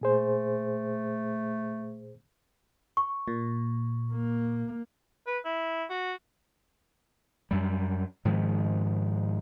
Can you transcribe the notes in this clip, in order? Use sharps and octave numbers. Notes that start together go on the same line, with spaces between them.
A#2 A3 G#4 C5
C#6
A#2
A#3
B4
E4
F#4
F#2 G3
G#2 D#3 F3